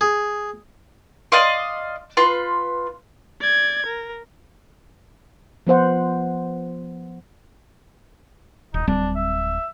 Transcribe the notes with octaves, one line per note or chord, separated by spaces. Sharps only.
G#4
D5 D#5 F5 C6
F4 B4 C6
D5 G#6
A#4
F3 B3 C5 F#5
D#1 D#4
D1 G3 C4 D4
E5